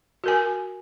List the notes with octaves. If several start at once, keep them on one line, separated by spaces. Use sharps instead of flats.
F#4 A#4 G#5